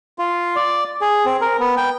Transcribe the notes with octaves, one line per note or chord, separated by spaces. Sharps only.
F4
D5
G#4
C4
A#4
B3
G5